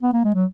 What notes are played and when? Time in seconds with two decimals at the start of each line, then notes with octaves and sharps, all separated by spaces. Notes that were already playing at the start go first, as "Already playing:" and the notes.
0.03 B3
0.13 A#3
0.25 G#3
0.35 F#3